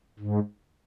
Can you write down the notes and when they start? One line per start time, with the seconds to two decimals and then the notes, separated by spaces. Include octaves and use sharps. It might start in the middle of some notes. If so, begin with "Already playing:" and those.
0.19 G#2